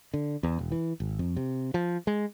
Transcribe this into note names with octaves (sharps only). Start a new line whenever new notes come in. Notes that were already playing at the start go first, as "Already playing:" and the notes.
D3
E2
E1
E3
G#1
F2
C3
F3
G#3